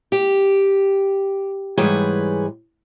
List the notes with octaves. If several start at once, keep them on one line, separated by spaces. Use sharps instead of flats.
G4
G#2 E3 G3 G#4 B4 C#5